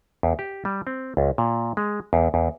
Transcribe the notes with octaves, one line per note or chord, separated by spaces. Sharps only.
E2
G4
G3
C4
C#2
A#2
G#3
E2
E2